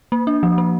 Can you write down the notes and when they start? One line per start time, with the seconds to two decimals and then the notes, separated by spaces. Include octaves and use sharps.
0.12 A#3
0.27 D4
0.43 F3
0.58 A#3